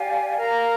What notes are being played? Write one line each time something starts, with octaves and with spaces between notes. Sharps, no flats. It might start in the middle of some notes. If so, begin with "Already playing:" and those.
Already playing: G4 D5 F5 G#5
A#4 F5 A#5